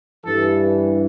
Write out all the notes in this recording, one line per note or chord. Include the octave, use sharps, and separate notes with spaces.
G2 E3 A4